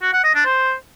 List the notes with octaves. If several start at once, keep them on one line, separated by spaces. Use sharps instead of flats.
F#4
F#5
D#5
D4
C5